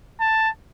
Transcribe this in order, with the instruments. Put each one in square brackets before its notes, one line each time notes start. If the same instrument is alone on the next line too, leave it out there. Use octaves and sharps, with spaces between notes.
[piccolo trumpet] A5